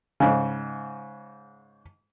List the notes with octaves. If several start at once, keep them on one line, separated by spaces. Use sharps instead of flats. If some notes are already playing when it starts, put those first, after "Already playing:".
G#2 C#3